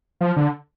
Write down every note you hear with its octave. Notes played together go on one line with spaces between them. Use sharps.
F3
D3